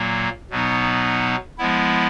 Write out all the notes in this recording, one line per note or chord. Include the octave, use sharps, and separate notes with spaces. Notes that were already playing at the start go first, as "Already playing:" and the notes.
Already playing: A#2 F#3 A#3
B2 F#3 B3 D#4
F3 G#3 B3 E4